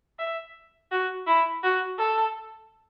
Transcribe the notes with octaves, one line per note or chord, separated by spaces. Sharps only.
E5
F#4
E4
F#4
A4